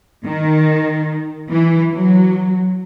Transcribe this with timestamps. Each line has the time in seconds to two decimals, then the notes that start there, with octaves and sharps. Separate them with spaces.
0.24 D#3
1.50 E3
1.93 F#3